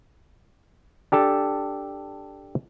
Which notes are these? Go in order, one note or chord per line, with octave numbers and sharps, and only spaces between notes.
D4 G4 A4 A5